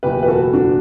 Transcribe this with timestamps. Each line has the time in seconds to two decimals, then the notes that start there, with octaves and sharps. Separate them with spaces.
0.03 F#1 E2 B2 G4 B4
0.23 B4
0.27 F#4 A4
0.53 D4 F#4